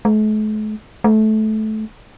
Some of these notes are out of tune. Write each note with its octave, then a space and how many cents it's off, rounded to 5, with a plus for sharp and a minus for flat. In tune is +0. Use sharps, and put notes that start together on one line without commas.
A3 -45
A3 -20